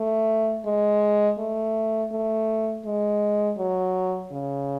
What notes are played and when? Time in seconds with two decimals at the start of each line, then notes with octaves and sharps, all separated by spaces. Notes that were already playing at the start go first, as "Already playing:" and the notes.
Already playing: A3
0.66 G#3
1.39 A3
2.12 A3
2.86 G#3
3.58 F#3
4.32 C#3